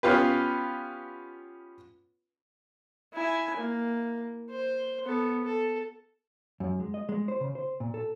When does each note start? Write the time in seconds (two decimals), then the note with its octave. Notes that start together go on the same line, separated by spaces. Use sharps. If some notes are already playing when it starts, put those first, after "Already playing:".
0.03 B3 C#4 F4 G4 B4
3.13 E4 G#5
3.57 A#3
4.51 C5
5.05 B3 A4
5.45 A4
6.60 F#2
6.80 G#3
6.94 D#5
7.09 G#3
7.28 C5
7.41 C#3
7.55 C5
7.80 A#2
7.94 A4